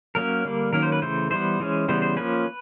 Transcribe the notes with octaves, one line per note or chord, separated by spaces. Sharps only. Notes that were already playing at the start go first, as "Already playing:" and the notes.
F#3 A#3 C#4 A#4
D3 G3 A#3
D#3 F#3 A#3 C#4 A#4
C5
B4
C#3 E3 A3 C5
E3 G3 B3 C5
E3 G#3 C#4
C#3 E3 G3 B3 C5
C5
F3 A#3 C#4 B4